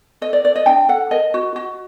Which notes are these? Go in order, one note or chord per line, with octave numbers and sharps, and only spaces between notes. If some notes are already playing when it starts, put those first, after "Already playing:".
A4 D#5
D5
A4 D5
D#5
D4 G5
A4 F#5
A#4 D#5
F#4
F#4